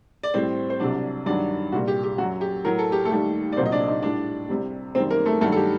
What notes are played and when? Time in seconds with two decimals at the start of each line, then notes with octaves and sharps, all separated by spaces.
0.23 D5
0.34 A2 G3 C4 C5
0.70 C5
0.79 C2 C3 F#3 D4 D5
1.26 G2 D#3 F#3 D4 D5
1.72 C2 A#2 G3 F#4
1.88 G4
2.04 G4
2.18 F#2 F#3 F#4
2.41 G4
2.64 A2 F#3 A#4
2.79 A4
2.92 G4
3.05 A3 A4
3.11 D#2 D#3 G3
3.52 D5
3.57 C2 A#2 F#3 C4 C5
3.66 D#5
3.72 D4 D5
3.87 D#4 D#5
4.02 A2 G3 D4 D5
4.49 C2 C3 G3
4.95 F#2 D#3 G3 C4 C5
5.10 A#3 A#4
5.26 A3 A4
5.41 G2 D#3 F#3 A3 A4
5.52 A4
5.56 G4